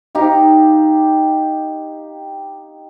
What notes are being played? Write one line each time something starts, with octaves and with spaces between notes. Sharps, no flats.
D#4 G4 F5